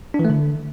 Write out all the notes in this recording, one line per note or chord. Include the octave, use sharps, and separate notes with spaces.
D4
E3
A3
D3